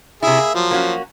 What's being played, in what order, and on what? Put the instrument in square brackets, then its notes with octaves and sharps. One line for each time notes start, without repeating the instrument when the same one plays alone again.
[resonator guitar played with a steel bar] C3 E4 [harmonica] G#4 E5
[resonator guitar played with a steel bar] A#3
[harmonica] F3 F#3
[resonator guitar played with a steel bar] A#3 C#4 F#4